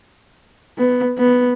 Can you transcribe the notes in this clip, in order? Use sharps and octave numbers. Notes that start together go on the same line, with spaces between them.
B3
B3